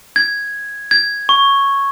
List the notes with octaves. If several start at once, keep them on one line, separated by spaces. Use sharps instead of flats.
G#6
G#6
C#6